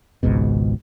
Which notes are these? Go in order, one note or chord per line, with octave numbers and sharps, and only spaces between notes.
G#1 C#2 G#2 B2